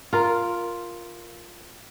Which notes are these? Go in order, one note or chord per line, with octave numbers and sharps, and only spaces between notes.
F4 A#4